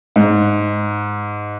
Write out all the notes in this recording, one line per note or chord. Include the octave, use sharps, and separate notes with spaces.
G#2